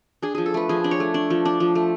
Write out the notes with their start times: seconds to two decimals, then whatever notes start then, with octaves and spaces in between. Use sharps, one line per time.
0.22 D4 G#4
0.35 F3 G#4
0.46 A4
0.54 A3 B4
0.69 F3 G#4
0.84 D4
0.91 C#5
1.00 A3
1.14 D4
1.30 F3
1.45 D4
1.60 F3
1.75 A3